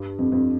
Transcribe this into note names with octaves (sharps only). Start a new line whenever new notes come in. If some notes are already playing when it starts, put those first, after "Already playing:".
Already playing: G2
F2
F2